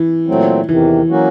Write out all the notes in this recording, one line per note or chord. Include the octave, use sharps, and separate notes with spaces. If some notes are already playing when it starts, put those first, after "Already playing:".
Already playing: E3
A#2 F#3 A3 C4
E2 C3 D#3 E3
F#3 A#3 C#4 F#4